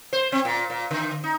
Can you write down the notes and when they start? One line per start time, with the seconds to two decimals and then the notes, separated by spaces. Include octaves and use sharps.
0.13 C5
0.32 C4
0.45 A#2
0.70 A#2
0.91 D3
1.24 D#4